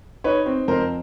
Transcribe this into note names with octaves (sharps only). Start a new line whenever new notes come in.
D#4 B4 C#5
C4
F2 A#4 C5